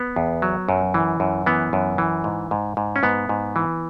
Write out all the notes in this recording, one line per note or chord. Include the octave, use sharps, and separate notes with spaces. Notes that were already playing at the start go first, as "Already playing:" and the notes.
Already playing: B3
E2
F#3
F#2
E3
F#2
E3 B3
F#2
E3
G#2
G#2
G#2
C#4
G#2 B3
G#2
E3